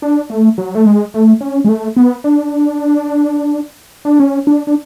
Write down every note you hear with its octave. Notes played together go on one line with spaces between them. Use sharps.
D4
A3
F#3
A3
G#3
A3
C#4
G#3
A3
B3
D4
D4
C#4
D4
D4